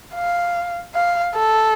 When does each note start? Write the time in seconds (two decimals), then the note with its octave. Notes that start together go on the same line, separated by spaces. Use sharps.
0.14 F5
0.95 F5
1.35 A4